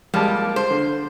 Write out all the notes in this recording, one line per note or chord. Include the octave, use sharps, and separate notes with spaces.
G3 G#3 A#3 A5
C5
D3